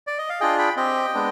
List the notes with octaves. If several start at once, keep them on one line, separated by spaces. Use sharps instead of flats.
D5
D#5
F5
D4 F4 G#4 D#5 G5
G5 B5
C4 G4 D#5 G5
G#3 B3 D4